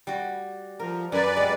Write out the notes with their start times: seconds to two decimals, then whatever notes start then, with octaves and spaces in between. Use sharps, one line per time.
0.07 G3 F#4
0.79 F3 A#4
1.12 F#2 B4 D5 G#5
1.37 G3 G#3